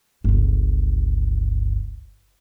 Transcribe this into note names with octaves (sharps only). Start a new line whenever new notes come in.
G1 C#2